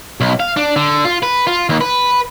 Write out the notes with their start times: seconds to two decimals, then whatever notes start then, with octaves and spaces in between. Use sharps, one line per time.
0.20 B1
0.40 F5
0.57 D4
0.76 D3
1.05 F4
1.23 B4
1.47 F4
1.69 D#2
1.81 B4